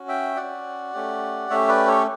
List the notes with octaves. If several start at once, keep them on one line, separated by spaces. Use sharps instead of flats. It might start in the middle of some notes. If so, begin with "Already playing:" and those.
Already playing: C#4 F#4
E5 G5
C#4 F#4 D5 F#5
A3 C#4 G4
A3 C#4 G4 C#5 E5
B4 D5
A4 C#5